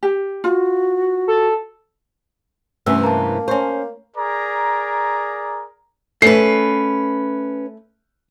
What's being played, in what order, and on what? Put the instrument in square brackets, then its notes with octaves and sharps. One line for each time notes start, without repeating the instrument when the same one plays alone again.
[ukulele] G4
[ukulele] F4 [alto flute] F#4
[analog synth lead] A4
[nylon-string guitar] G2 C3 E3 [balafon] A3 C#4 G#5 [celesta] E6
[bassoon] A#3 [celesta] A5 A#5
[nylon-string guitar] C#4 C5 [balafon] C#5 C#6
[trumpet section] G#4 A#4 D5 A#5
[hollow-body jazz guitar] A3 [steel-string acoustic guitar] C#4 B4 [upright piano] C7